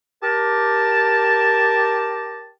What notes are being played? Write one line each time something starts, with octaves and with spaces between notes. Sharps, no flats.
G4 A#4 A5